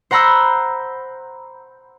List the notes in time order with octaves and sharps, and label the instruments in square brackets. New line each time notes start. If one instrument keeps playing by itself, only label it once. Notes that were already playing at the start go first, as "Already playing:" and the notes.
[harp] C5 F#5 A#5 B5 E6 G6